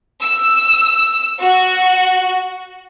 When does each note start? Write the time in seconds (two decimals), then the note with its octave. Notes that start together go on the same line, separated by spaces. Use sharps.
0.22 E6
1.40 F#4